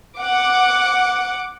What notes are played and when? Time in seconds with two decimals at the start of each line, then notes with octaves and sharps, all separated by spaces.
0.18 F#5 D6